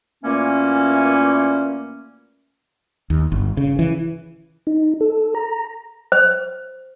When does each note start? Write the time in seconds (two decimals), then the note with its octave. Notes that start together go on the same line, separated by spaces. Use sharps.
0.24 A#2 E3 A3 A#3 C#4
3.10 D#2
3.32 G1
3.57 C#3
3.79 E3
4.67 D#4
5.01 A4
5.35 A#5
6.12 C5